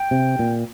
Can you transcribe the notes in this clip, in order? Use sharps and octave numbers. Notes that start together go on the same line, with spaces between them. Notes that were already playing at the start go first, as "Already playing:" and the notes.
Already playing: G5
C3
A#2